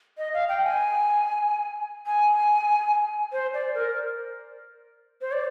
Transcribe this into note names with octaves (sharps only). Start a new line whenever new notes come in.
D#5
F5
G5
G#5
G#5
C5
D5
A#4
C5
D5